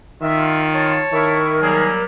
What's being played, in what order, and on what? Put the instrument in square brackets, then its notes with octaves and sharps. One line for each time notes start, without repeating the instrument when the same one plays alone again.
[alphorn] D#3 [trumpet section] F4 [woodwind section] E5
[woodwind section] C#5 A5
[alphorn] D#3 [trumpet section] E4 C#6 [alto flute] A#4
[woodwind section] F#3 G3 A#3 [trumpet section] G#4